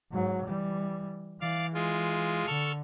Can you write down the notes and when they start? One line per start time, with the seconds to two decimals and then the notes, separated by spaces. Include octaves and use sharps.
0.12 G#2 F#3
0.45 E3 G3
1.41 E3 D5 F5
1.74 G#3 F4
2.47 D3 A4 C#6 F6